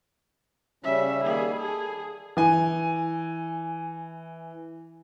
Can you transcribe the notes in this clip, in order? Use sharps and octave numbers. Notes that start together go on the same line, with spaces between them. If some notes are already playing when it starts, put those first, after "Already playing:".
C#3 G3 C#4 E5
D#3 G3 A#3 G#4
G#4 A4
E3 G#5